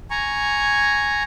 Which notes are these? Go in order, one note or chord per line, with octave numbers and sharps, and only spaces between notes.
G#5 A#5 C#6